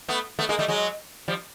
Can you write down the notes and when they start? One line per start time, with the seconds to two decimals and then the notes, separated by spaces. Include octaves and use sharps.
0.09 A3 B3
0.39 A3 B3
0.49 G#3 A#3
0.59 G3 A3
0.68 F#3 G#3
1.28 F3 G3